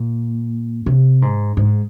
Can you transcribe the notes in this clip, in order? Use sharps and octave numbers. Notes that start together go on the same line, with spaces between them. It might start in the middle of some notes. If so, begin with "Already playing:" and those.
Already playing: A#2
C3
G#2
G#2